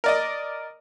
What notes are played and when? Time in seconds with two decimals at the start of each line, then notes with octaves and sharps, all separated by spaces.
0.04 A#4 D5 D#5